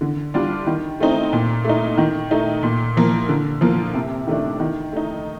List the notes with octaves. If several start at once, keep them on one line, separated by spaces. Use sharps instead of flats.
D3
G3 D4 F4
D#3
A3 C4 D#4
A#2
A3 D#4
D#3
A3 D#4
A#2
F3 A#3
D3
F3 A#3 F4
C3
D#3 A3 D4
D#3
A3 D#4